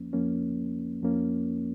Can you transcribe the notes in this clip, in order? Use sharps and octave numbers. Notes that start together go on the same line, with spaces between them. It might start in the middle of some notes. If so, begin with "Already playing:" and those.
Already playing: F2 F3 A#3 C#4
F2 F3 A#3 C#4
F2 F3 A#3 C#4